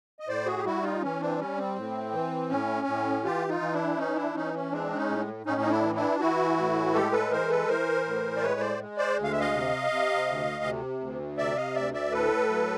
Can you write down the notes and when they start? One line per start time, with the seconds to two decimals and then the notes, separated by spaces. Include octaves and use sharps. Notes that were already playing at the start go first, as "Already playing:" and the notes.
0.20 D#5
0.27 A2 C5 D5
0.46 F#4 G#4
0.58 G4
0.65 G3 E4 F#4
0.83 D#4 F4
1.02 E3 C#4
1.21 C4 D4
1.38 G3 C#4
1.58 C4
1.76 A2
2.13 E3
2.50 A2 C#4
2.87 A2
3.24 E3 F4 G4
3.48 D#4 F4
3.60 E3
3.73 D4 E4
3.98 E3 C#4 D#4
4.16 D4 E4
4.35 E3 C#4 D#4
4.54 C#4
4.71 G#3 C4 D4
4.96 C#4 D#4
5.08 A2
5.46 A2 C#4 D#4
5.61 D#4
5.70 D4 E4
5.83 E3
5.95 D4 E4
6.20 E3 E4 F#4
6.57 A2
6.94 G#3 G4 A4
7.12 A4 B4
7.31 E3 A#4 C5
7.50 A4 B4
7.68 E3 A#4 C5
8.05 A2
8.37 D5
8.42 G#3 B4 C#5
8.60 C5 D5
8.79 G#3
8.97 C5 D5
9.17 D2
9.24 F5
9.32 E5
9.40 D#5 F5
9.54 C3
9.91 C3
10.27 D2
10.64 C3
11.01 D2
11.38 C3 D5 E5
11.56 D#5 F5
11.75 D2 D5 E5
11.93 D5 E5
12.12 A2 A4 B4
12.49 F#3